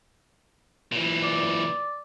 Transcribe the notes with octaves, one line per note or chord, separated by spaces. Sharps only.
A#2 E3
D5